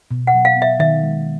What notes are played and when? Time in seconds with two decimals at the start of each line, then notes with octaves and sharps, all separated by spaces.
0.11 B2
0.27 F#5
0.34 F#3
0.45 F5
0.56 B3
0.62 E5
0.79 D#3 E5
1.03 G#3